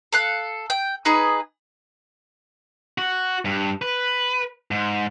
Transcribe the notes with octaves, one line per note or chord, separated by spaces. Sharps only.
A4 F5 F#6
G5
D#4 G#4 B4 D#5
F#4
G2
B4
G#2